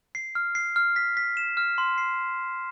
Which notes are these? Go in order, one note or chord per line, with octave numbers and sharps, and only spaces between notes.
C7
F6
C7
F6
B6
B6
E7
F6
C6
C7